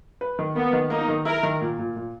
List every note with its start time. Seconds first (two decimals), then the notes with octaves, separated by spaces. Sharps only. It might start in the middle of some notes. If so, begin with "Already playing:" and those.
0.21 B4
0.39 D#3
0.56 A#3 B3
0.73 D#3
0.90 A#3 D#4
1.08 D#3
1.25 E4 A#4
1.43 D#3
1.61 A#2
1.79 A#2
1.96 A#2